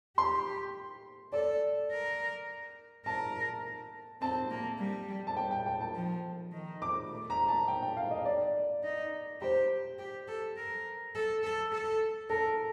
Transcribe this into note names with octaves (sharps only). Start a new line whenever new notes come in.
G4 C6
A4 D5
A#4
A#4 A5
C4 A5
A#3
G3
A5
G5
G5
G5
A5
F3
D#3
D6
A3
A#5
A5
G5
G5
F5
D#5
D5
D#4
G4 C5
G4
A4
A#4
A4
A4
A4
A4 A#4